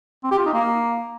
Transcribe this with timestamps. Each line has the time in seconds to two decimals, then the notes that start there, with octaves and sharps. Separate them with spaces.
0.24 C4
0.31 G4
0.39 F4
0.46 D#4
0.53 A#3